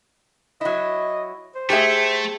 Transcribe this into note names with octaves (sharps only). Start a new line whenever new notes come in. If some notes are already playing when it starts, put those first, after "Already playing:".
F#3 E4 D#5
C5
A3 G4 G#4 E5